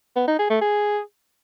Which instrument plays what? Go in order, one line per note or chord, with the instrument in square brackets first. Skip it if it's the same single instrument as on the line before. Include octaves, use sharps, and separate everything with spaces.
[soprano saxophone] B3
D#4
G#4
A3
G#4